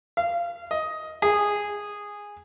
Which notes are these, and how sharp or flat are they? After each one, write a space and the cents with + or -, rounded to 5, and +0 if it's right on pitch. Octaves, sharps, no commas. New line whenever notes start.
F5 -20
D#5 +10
G#4 -10